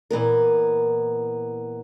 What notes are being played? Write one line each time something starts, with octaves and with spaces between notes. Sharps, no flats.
A#2 E3 B3 A#4